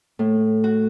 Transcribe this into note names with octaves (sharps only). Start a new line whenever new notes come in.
A2
F#4